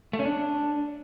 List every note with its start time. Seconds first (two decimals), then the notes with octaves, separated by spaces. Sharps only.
0.13 A3
0.19 C#4
0.25 D4